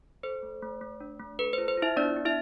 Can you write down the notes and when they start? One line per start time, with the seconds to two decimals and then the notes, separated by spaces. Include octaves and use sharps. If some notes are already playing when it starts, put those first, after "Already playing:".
0.23 A4 C5
0.43 A3
0.62 A3
0.81 A3
1.00 D4
1.19 A3
1.39 A4 B4
1.53 F4 C5
1.68 C5
1.77 F4
1.82 E4 E5
1.96 B3 D4 D5
2.16 B3
2.25 E4 E5